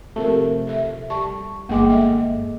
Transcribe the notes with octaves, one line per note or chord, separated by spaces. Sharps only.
C3 F3 A3 G4 A#4
A4 E5
G3 A5 C#6
G1 G#3 A#3 G5 D6
A4 D#5 E5